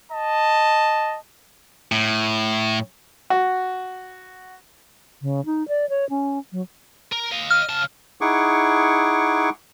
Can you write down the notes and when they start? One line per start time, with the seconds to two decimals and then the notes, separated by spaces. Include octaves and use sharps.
0.12 D#5 A5
1.92 A2
3.30 F#4
5.22 C#3
5.46 D#4
5.68 D5
5.89 C#5
6.10 C#4
6.52 F#3
7.12 A#4
7.32 D#5 F5
7.51 F6
7.69 C#3 A5
8.21 D#4 E4 G#4 F#5 C#6 D6